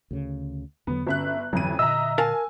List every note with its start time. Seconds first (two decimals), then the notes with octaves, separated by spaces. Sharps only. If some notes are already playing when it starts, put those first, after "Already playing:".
0.11 D2 C#3
0.87 E2 D3 F#3 B3
1.07 G1 C#4 E5 F#6
1.53 A1 F2 D3 E3 F#3 D#7
1.79 A#2 D3 D#5 E5 A#5 E6
2.18 A#4 F5 G#5 A5